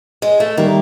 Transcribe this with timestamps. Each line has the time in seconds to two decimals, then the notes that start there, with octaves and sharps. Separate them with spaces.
0.22 G#3
0.40 A3
0.57 D#3 G3 A#3